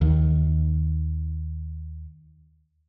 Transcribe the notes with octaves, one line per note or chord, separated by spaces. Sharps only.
D#2 D#3